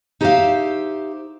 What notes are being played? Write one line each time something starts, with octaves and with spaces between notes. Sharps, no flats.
D#4 G4 C5 C#5 E5 F5